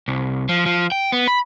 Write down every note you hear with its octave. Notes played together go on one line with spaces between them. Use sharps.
C2
F3
F3
G5
B3
B5